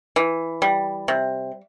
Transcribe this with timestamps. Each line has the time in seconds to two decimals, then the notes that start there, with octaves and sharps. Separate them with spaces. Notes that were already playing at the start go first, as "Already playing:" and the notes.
0.16 E3
0.62 G3
1.08 C3